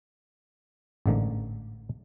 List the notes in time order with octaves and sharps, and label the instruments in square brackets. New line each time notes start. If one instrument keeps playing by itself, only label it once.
[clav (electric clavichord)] A1 G#2 D3 A#3